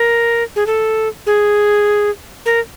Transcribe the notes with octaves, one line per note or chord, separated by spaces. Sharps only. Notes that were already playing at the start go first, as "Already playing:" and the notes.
Already playing: A#4
G#4
A4
G#4
A#4